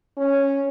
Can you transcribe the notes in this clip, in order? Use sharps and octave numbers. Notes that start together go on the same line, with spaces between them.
C#4